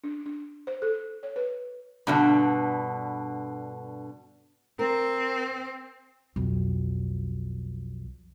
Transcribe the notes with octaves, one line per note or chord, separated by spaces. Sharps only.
D4
D4
C5
A4
C#5
B4
G2 B2 D3
C4 A#4
B1 F2